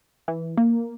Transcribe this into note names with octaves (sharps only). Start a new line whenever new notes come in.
E3
A#3